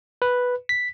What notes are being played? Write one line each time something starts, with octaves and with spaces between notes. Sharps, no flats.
B4
B6